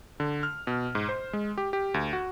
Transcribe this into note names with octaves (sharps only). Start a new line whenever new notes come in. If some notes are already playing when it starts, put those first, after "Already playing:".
D3
F6
B2
G#2
C5
G#3
G4
G4
D2
F#4